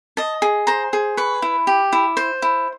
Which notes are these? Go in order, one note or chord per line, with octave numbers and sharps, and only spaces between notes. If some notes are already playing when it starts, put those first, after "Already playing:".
D#5 A5
G#4
C5 A#5
G#4
B4 C#6
E4
G4
E4
C5
E4